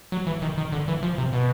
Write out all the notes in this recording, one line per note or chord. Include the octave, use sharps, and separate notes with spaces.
F#3
E3
D#3
D#3
D3
E3
F3
C3
B2